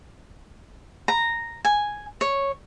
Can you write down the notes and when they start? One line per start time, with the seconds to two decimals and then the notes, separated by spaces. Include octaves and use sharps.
1.08 A#5
1.65 G#5
2.21 C#5